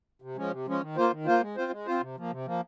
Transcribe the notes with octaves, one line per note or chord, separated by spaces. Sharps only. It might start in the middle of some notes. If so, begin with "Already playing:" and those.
C3
F3 G#3 C#4
C3
F3 G#3 C#4
D#3
A#3 F4 C5
D#3
A#3 F4 C5
G#3
C4 F4 C5
G#3
C4 F4 C5
C3
F3 A#3
C3
F3 A#3